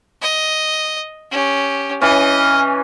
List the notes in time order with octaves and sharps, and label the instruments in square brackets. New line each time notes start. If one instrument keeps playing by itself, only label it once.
[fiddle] D#5
C#4 G4
[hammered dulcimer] E3 C#4 [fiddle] D#5